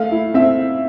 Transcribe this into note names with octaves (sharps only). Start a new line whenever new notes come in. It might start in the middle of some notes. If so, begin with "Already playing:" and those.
Already playing: A3 F5
E4
C4 E5